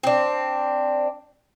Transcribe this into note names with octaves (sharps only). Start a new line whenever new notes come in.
C4 D4